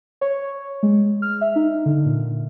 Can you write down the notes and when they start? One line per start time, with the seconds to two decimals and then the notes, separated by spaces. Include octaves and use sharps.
0.21 C#5
0.83 G#3
1.22 F6
1.41 E5
1.56 D#4
1.86 D3
2.05 A#2